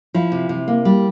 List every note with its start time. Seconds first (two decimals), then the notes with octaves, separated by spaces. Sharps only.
0.14 F3 E4
0.32 C3
0.49 C3
0.68 A#3
0.85 G3